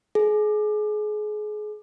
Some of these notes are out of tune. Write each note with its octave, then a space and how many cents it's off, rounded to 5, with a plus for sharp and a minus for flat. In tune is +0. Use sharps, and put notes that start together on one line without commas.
G#4 +30